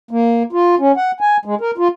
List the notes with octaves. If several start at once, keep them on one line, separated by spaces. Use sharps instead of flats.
A#3
F4
C#4
F#5
G#5
G#3
A#4
F4